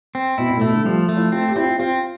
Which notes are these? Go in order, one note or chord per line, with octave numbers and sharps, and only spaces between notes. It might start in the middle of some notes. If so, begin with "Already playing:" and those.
C4
B2 E4
B2
A2
B2 A3
D3
F3 G3
A3
E4
C4 F4
G4
C4 E4
F4
C4 F4